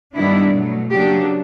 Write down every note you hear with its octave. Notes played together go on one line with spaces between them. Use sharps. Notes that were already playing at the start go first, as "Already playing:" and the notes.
G2 D#3 G3 B3 D4 E4
B2 F#3 A3
C#3 F#3 A#3 D4 G4